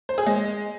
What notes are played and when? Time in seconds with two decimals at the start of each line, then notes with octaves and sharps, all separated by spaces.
0.09 C5
0.18 G#4
0.27 G#3